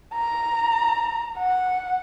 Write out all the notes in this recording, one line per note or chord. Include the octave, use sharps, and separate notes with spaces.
A#5
F#5